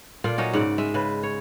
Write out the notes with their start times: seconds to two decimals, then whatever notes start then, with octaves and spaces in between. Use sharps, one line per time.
0.24 A#2 F4 A4 D5
0.38 F#3 C#4 D#4 F#4
0.53 G#2 C#3 D5 F#5
0.78 G#3 E5
0.94 C#3 B4
1.23 C#5